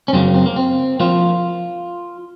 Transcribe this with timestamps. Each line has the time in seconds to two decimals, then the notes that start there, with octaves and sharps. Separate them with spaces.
0.08 C#4
0.13 F#2 C#3 F#3 A#3 C4
0.35 C4
0.46 A#3
0.56 C4
1.00 F3 A#3 F4